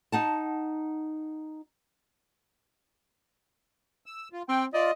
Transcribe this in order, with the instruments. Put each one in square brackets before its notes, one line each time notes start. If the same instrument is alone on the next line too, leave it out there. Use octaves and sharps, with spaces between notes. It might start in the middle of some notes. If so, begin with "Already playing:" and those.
[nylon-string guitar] D#4 F#5 A5
[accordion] E6
F4
[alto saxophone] C4 [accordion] G5
[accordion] F4 D5 [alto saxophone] D#5